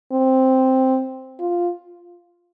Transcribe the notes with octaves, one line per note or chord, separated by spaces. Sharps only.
C4
F4